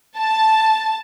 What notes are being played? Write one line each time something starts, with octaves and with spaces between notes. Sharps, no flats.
A5